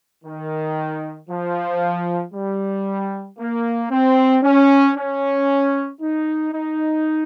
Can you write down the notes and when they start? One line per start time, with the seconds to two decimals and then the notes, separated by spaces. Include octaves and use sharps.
0.24 D#3
1.29 F3
2.33 G3
3.38 A#3
3.90 C4
4.43 C#4
4.95 C#4
6.01 D#4
6.52 D#4